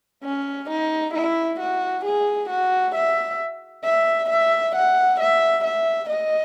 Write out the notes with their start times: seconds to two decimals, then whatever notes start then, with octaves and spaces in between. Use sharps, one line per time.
0.24 C#4
0.70 D#4
1.14 E4
1.60 F#4
2.05 G#4
2.49 F#4
2.95 E5
3.84 E5
4.30 E5
4.75 F#5
5.20 E5
5.64 E5
6.10 D#5